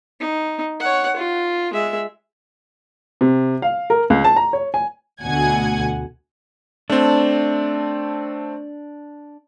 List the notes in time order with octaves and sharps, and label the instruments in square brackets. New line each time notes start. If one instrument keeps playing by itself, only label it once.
[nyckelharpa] D#4
C#5 F#5
F4
G#3 E5
[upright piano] C3
F5
A#4
C#2
A5
A#5
C#5
G#5
[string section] D2 B2 F#5 G#5 G#6
[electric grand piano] A3 C4 [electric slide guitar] D4